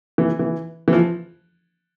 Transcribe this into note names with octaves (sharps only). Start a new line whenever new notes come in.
E3
E3
E3
F3